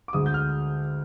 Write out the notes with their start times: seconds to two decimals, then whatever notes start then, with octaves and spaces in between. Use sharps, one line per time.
0.08 D6
0.13 D2 D3 G#3 D#6
0.26 G6
0.34 F6